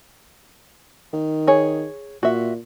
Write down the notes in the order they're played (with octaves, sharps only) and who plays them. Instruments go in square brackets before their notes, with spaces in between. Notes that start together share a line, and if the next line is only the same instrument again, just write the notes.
[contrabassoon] D#3
[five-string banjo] G#4 C#5
[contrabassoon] A#2 [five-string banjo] F#4 E5